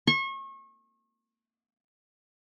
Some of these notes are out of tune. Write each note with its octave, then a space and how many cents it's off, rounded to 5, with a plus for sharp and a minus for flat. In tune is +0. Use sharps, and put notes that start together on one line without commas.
C#6 -35